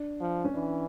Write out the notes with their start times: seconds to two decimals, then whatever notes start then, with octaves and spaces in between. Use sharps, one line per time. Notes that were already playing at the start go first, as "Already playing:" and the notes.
Already playing: D4
0.21 F3
0.44 C#4
0.53 E3 D4